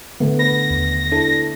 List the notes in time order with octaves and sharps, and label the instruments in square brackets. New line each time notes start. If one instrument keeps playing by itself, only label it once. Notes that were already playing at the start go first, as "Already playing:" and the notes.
[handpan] D3 A3 B3
[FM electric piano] B4 [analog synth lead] A#6
[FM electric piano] D#2
D4 E4 A4